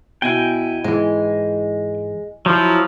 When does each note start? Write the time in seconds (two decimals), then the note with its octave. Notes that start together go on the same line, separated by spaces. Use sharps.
0.22 B2 E4 G5 G#5
0.84 G#2 E3 G#3
2.46 F3 F#3 E4